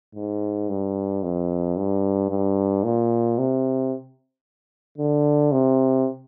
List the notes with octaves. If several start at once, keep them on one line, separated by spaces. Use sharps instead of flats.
G#2
G2
F2
G2
G2
A#2
C3
D3
C3